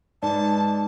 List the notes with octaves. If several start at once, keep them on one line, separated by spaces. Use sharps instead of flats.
G#2 B4 D5 A5